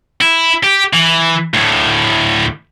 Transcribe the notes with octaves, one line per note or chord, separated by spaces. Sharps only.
E4
G4
E3
D2 A2